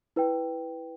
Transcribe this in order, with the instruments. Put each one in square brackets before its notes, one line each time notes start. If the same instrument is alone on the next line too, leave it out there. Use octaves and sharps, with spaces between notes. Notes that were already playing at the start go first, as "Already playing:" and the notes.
[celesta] E4 B4 G5